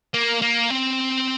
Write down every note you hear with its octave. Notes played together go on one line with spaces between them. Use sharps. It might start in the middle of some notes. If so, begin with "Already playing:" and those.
A#3
A#3
C4